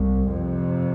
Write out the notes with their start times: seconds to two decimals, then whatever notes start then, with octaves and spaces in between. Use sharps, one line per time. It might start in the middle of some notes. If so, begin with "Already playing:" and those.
Already playing: C2
0.28 F2 C3